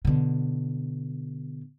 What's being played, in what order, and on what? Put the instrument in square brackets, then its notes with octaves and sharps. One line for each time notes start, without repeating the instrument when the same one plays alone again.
[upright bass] B2 D3